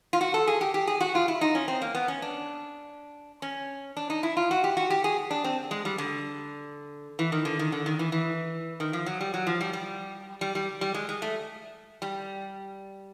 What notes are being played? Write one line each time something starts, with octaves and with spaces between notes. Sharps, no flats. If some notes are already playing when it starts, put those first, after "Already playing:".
F4
F#4
A4
G#4
G4
G4
G#4
F#4
F4
E4
D#4
C#4
C4
A#3
B3
C#4
D4
C#4
D4
D#4
E4
F4
F#4
G4
F#4
G4
G#4
D4
C4
G#3
G3
D3
E3
D#3
D3
D#3
D3
D#3
E3
E3
D#3
F3
F#3
G3
F#3
F3
G3
G3
G3
G3
G3
G#3
G#3
A3
G3